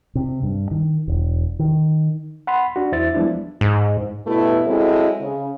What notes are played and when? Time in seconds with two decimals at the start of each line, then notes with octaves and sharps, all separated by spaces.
0.15 C3
0.43 G2
0.71 D#3
1.08 E1
1.59 D#3
2.47 F#5 B5 C6
2.76 D4 F#4
2.92 E2 E4 C5 E5 A6
3.14 F3 G3 G#3 B3 D4 E4
3.61 G#2
4.26 G2 B2 A3 E4 G4 B4
4.66 F#3 G#3 C4 E4 A4
5.21 C#3